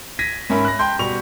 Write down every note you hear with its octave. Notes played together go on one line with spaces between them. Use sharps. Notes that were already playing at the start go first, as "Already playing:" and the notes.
G#6 A#6 B6 D#7
G#2 C#4 A#4 E5 B5
F#6 A#6
G5 A5 C6 G6
B2 G3 C#6 F7